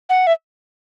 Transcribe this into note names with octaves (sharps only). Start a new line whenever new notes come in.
F#5
E5